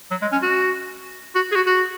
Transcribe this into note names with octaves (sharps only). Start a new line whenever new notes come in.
F#3
G#3
C#4
F#4
F#4
G#4
F#4
F#4